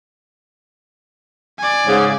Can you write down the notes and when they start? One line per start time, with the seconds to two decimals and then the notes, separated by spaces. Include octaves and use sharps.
1.59 D5 G#5
1.87 G#2 C#3